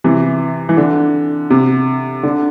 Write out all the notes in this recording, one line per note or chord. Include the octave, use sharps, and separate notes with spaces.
C3 E3
E3
D3
C3
D3